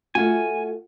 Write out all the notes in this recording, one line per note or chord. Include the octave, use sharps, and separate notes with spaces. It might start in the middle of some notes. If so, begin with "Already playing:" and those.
A3 F4 F#4 G#5